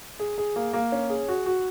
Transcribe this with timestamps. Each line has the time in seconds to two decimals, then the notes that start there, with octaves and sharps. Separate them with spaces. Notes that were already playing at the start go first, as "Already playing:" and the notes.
0.19 G#4
0.38 G#4
0.56 A#3
0.73 A#3
0.92 C#4
1.10 G#4
1.28 F#4
1.46 F#4